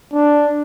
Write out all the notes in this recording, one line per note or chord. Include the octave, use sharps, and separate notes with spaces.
D4